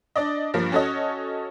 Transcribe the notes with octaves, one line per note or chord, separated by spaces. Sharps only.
D4 D5 D#5
G2 F3 A#3
C#4 F#4 A4 C#5 D#5